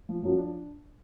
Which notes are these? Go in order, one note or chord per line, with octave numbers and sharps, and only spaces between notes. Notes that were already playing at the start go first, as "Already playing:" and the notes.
F3
F#2 F3 F#3
D4